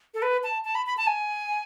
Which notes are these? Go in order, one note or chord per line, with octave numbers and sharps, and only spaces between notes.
A4
B4
A5
A5
B5
B5
A5
G#5